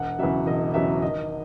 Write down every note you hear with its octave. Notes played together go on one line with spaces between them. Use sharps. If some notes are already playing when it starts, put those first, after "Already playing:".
Already playing: E1 F#5
E2 C#3 F#3 E5
E1 D#5
E2 C#3 F#3 E5
G#1 D#5